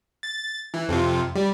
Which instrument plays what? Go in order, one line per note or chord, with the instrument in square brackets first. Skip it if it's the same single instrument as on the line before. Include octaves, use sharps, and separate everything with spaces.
[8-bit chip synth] A6
E3
F2 C3 F4
G3